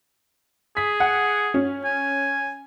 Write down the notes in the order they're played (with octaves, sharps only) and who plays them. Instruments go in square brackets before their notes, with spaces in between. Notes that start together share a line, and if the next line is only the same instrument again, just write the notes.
[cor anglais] G#4 [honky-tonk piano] B6
[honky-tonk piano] F#5
C#4
[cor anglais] G#5